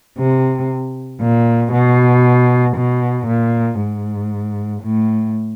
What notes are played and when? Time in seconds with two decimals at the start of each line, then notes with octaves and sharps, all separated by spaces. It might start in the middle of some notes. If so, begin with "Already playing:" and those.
0.18 C3
1.21 A#2
1.72 B2
2.77 B2
3.27 A#2
3.79 G#2
4.82 A2